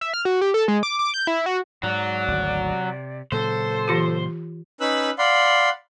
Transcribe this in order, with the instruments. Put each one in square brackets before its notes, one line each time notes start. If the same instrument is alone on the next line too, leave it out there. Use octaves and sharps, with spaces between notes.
[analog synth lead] E5
F6
F#4
G4
A4
G#3
D6
D6
G6
E4
F#4
[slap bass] G#2 [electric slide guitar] F#3 [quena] D5
[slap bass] G#1 D2
C3
[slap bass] A#2 C#3 F#3 [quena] A4 [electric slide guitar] C5
[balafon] E3 F4 G4
[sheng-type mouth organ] C#4 D#4 B4 B5 E6 F#6
D5 F5 F#5 B5 C6